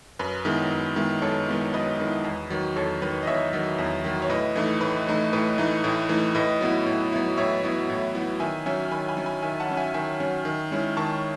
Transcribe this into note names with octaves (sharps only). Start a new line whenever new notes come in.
F#2 B4
D#3 G#3 B3 E4
F#2
D#3 G#3 B3 E4
F#2 A4 C#5
D#3 G#3 B3 E4
F#2 B4 D#5
D#3 G#3 B3 E4
E2
D#3 F#3
E2 A4 C#5
D#3 F#3 B4
D#5
E2 C#5 E5
D#3 F#3
E2
D#3 F#3
C#5
A2 B4 D#5
E3 A3 D#4
A2 B4
E3 A3 D#4
A2 B4
E3 A3 D#4
A2
E3 A3 D#4
A2 B4 D#5
F#3 B3 E4
A2
F#3 B3 E4
A2 C#5 E5
F#3 B3 E4
A2
F#3 B3 E4
D#3 E5 G#5
F#3 C#4 E5 G#5
D#3 G#5 B5
G#5 B5
F#3 C#4
G#5 B5
D#3 E5 G#5
F#5 A5
F#3 C#4
E5 G#5
D#3 E5 G#5
F#3 C#4
D#3
G#3 C#4 E4
D#3 A5 C#6